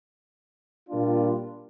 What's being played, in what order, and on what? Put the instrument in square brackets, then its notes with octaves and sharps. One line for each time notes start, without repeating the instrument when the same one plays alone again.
[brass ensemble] A#2 G3 A#3 D4 F4